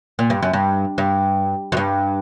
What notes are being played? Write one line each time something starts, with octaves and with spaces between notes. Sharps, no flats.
A#2
G2
F#2
G2
G2
F#2
G2